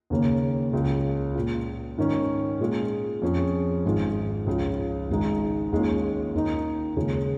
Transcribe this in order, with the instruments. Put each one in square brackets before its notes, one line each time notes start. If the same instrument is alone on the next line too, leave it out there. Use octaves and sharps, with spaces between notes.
[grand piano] D#2 C#3 A#3
C#2 C#3 G#3
A#2 G#3 F4
G#2 D#3 C#4
A#2 G#3 F4 G#4
F2 F3 C#4 G#4
G#1 G#2 G#3 F4 G#4
C#2 C#3 F3
G#1 G#2 G#3 D#4
D#2 D#3 G#3 C#4 F4
D#2 D#3 A#3 D#4
D#2 C#3 G#3 F4 G#4